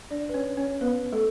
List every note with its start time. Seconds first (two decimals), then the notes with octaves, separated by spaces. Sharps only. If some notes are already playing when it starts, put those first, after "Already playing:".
0.10 D4 D5
0.29 B4
0.34 C#4 C#5
0.57 C#4 C#5
0.81 B3 B4
1.13 A3 A4